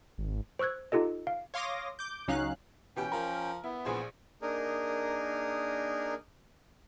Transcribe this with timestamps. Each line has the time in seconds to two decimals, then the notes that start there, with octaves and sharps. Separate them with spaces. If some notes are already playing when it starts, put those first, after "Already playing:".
0.18 G#1
0.59 C5 C#6 E6 F#6 G#6
0.92 D#4 F4 G4 A4 D#5
1.27 F5
1.54 C#5 F5 C6 D6 D#6 A#6
1.99 D6 G6
2.28 C#2 F#3 C#4 D#4 F5 F#6
2.97 B2 E3 C#4 G4 G5
3.12 F3 A#4
3.64 B3 E4
3.85 A#1 E3 G#4 C5
4.42 A#3 D4 D#4 G#4 A#4